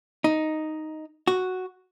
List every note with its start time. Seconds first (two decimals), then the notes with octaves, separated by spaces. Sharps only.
0.24 D#4
1.27 F#4